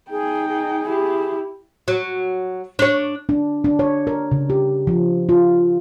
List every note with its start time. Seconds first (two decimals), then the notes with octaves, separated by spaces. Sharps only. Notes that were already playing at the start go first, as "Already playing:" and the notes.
0.11 D#4 G#4 G5
0.48 G#4
0.87 E4 G4
1.88 F#3
2.79 D4 C#5
3.29 D4
3.64 D4
3.79 C#5
4.07 A#4
4.32 C#3
4.50 G4
4.87 F3
5.29 F4